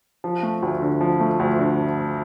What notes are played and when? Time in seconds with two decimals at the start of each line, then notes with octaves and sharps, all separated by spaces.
0.24 F3
0.43 A3
0.62 D2
0.82 D3
1.01 F3
1.20 A3
1.39 D2
1.59 D3